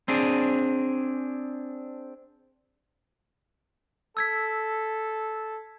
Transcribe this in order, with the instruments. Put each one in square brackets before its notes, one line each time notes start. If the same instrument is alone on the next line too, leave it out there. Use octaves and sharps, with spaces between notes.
[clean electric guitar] C4 D4 G#4
[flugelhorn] A4 [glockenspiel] E6 G#6 B6